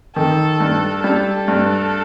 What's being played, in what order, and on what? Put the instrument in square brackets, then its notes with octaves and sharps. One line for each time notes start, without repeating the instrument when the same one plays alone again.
[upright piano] D#3 [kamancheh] A4
[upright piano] G2
[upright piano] G3 [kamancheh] A4
[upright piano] G2